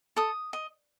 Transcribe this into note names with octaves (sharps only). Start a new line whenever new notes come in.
A4 D#6
D#5